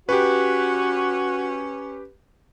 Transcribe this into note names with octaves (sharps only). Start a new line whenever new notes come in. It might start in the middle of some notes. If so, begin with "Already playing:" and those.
C#4 F#4 G4 B4